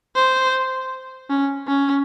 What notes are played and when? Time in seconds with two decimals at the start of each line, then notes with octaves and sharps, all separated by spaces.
0.15 C5
1.30 C#4
1.67 C#4